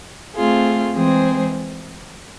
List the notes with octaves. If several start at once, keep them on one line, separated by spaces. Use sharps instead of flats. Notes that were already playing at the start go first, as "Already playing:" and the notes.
A3 C4 F4 G#4
E3 G#3 C4 G#4 C5